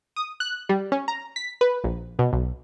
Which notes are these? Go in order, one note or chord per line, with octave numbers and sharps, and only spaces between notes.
D#6
F#6
G3
C#4
A#5
B6
B4
A#1
B2
B1